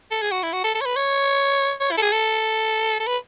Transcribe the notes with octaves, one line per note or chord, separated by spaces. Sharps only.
A4
G#4
F#4
E4
F#4
A4
A4
C#5
B4
C#5
C#5
E4
A4
G#4
A4
A4
B4